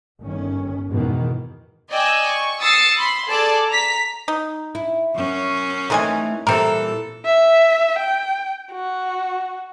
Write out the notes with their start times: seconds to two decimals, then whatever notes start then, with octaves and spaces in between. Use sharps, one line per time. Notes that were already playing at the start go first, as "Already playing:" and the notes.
0.22 G1 D#3 C#4
0.92 F2 G#2 B2 D#3 E3
1.90 D5 D#5 G5 G#5 E6
2.30 C#6
2.60 D#6 E6 A6 C7 C#7
2.98 B5 C6
3.28 G#4 A4 D5 A5
3.69 A#5 B6
4.28 D#4
4.75 E4
5.15 F#2 C#4
5.90 D#3 E3 G#3 A3 C4 G#5
6.47 A#2 E3 G3 C4 A4 A#4
7.25 E5
7.99 G5
8.73 F#4